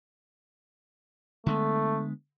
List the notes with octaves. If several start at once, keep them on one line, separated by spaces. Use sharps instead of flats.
D3 G#3 A3 B3